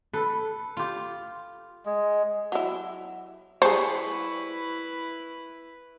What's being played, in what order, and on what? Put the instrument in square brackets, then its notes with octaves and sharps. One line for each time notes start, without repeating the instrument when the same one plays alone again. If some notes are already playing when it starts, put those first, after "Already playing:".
[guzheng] A4 B4
F4 G4
[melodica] G#3
[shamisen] F#3 E4
[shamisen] G3 G#4 [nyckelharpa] E4 B4 [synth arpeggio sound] C5 A5 G6 [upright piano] C#6